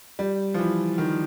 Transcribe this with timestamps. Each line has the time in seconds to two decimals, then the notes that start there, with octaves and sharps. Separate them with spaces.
0.19 G3
0.54 F3
0.59 E3
0.98 D#3